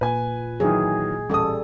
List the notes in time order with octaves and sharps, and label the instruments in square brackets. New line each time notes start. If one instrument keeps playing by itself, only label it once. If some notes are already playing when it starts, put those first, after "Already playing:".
[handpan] A#2 [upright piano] B4 G#5
[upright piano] D#3 E3 F#3 [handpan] G#4
[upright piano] A1 D#6 [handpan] G3 A4